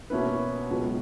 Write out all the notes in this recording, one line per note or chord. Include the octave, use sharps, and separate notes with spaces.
B2 A#3 C#4 E4 B4
C#2 B2 F#3 B3